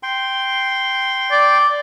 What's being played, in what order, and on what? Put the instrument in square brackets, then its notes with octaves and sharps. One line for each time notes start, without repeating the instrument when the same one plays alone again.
[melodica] G5 C6
[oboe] D5